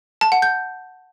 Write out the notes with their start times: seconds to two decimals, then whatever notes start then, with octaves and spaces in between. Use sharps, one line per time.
0.21 A5
0.32 F#5
0.42 G6